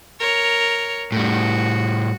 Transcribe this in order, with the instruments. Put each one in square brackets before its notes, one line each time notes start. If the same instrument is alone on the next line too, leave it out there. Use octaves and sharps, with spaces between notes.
[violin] A#4 C#5
[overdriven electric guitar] A2 G3 [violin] F#4